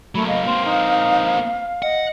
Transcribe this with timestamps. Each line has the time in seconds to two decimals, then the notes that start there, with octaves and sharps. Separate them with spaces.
0.15 F#3 A3 A#3 B5
0.27 D#5 F5
0.47 A#3 C4 C6
0.65 D#4
1.82 D#5 F#5